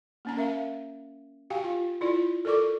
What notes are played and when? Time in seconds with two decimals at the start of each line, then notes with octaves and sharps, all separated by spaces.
0.25 A#3 C#4 A#5
0.37 A#4 E5 F5
1.50 F#4 G4 F5 G5 G#5
1.64 F4
2.01 E4 F4 D5
2.45 A4 A#4 D5 C#6 D6